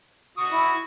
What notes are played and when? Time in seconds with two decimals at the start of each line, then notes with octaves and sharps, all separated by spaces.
0.38 F#4 C#6 D#6
0.51 E4